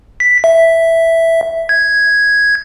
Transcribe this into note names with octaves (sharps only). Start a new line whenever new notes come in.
B6
E5
G#6